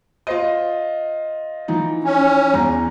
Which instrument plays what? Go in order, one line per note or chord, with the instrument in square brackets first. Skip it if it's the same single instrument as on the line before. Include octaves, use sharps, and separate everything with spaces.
[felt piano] F4 C5 D#5
E3 F3 D#4
[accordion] C#4
[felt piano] E2 A#5